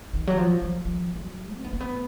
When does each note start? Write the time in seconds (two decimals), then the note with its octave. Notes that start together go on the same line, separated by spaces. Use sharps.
0.13 D#3
0.27 F#3
0.38 F3
0.62 F3
0.85 F3
1.16 F3
1.20 F#3
1.56 C#4
1.64 B3
1.73 A#3
1.80 B3